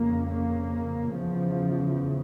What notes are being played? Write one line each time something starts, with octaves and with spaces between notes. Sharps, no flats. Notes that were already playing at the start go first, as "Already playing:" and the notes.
Already playing: F2 C#3 A#3
A#3
E2 C#3 F3